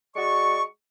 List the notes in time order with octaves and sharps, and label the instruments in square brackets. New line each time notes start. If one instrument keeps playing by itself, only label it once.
[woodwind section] G#3 F#4 D5 C#6